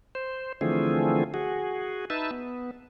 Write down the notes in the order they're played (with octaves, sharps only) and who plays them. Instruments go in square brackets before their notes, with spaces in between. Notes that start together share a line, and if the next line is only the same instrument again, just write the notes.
[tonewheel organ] C5
D3 E3 F3 A3 C4 G#4
F#4 G#4
D#4 B4 E5 A5
B3